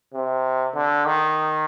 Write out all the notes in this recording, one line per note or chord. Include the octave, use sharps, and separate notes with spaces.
C3
D3
D#3